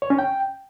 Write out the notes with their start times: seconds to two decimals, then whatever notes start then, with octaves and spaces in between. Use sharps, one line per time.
0.02 C#5
0.10 C#4
0.19 G5